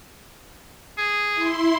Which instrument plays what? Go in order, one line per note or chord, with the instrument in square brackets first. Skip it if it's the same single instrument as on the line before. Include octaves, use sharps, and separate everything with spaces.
[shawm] G#4
[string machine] E4 C6